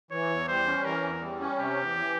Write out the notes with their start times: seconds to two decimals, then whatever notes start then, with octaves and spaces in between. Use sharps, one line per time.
0.11 E3 C#5
0.30 E2
0.48 G3 C5
0.67 C#4
0.85 E3 A#4
1.03 E2
1.22 G3
1.40 C#4
1.58 C3 G4
1.77 E2
1.95 E3